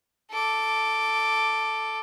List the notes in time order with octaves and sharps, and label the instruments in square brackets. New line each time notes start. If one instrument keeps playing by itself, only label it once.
[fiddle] A4 D6